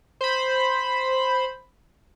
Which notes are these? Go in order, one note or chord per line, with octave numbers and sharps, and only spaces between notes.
C5 B5